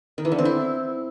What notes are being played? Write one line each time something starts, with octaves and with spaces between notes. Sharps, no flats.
D#3
E3
D3
C4
E4